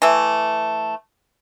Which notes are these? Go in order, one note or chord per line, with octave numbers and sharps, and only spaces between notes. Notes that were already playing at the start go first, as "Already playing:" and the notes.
E3 A3